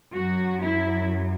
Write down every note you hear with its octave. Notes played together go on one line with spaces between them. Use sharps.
F#2 F#3 F#4
E4